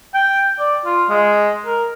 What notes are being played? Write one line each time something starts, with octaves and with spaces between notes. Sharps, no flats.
G5
D5
F4
G#3
A#4